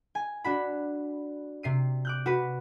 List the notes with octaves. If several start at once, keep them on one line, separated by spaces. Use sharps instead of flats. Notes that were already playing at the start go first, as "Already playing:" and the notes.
G#5
D4 F#4 B5
C3 C7 D#7
D6 F#6 G6
F#4 B4